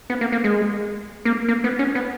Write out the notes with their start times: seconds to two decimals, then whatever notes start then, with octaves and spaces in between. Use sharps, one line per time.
0.10 B3
0.21 A#3
0.32 A#3
0.44 G#3
1.25 A#3
1.48 A#3
1.64 B3
1.79 C#4
1.95 B3